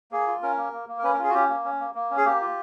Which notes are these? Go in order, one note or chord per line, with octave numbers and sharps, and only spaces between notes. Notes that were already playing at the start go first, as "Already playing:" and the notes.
A#3 G#4
F4
C#4 A#4
A#3
A#3
A#3
A#4
C#4 B4
A#4
F4
G#4
F#4
C#4 G4
A#3
C#4
A#3
A#3
C#4
G#4
A#3 G4
F4